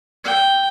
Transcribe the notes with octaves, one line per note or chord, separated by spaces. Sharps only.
G5